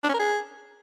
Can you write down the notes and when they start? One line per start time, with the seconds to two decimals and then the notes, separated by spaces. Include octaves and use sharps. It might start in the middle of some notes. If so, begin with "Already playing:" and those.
0.04 D4
0.09 C#4
0.14 A#4
0.19 G#4